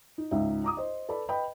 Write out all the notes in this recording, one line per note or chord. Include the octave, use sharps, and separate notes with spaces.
D#4
C#2 G#2 D#4 E5
A#5 D6 D#6
C5 D#5
A4 B4 D5 B5
B4 D#5 G5 B5